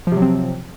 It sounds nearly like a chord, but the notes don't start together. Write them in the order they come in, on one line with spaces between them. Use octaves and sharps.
F3 C3 F#3 C4